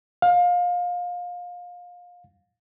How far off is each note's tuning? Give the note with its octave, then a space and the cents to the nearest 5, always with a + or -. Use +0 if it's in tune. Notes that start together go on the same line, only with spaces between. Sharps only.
F5 +25